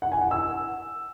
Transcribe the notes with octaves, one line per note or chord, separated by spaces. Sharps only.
F#5
G#5
F#5
E6